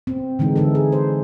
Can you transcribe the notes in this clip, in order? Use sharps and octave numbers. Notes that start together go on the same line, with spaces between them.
C4
D3 E3 G#3 D#4
D3 G#3 D#4 E4 A4
G#4
C5